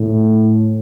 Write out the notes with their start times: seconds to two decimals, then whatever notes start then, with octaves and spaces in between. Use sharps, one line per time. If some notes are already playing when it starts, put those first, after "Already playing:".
Already playing: A2